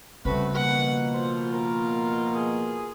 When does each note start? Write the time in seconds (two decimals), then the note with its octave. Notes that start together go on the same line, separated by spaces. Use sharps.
0.25 C#3 G3 A3 C4 F#4 B4
0.55 B2 F3 A#3 B4 F#5
1.14 F4 C5
1.53 A#4
2.35 G#4